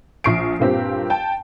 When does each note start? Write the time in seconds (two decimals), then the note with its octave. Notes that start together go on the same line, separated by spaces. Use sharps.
0.24 A#1 C#6 C7 D7
0.60 G2 A#2 C4 G4
1.10 G5 A5